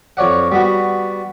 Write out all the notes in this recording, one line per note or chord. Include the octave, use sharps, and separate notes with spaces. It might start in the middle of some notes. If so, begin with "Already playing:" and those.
F2 C#5 D5 F#5
G3 B3 F#4